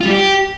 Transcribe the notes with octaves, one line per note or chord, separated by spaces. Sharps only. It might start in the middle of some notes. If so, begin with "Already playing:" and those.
F4
G3
G4